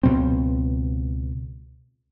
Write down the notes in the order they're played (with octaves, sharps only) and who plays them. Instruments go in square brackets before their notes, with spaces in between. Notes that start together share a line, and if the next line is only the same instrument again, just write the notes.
[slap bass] C#2 B2 F#3 C4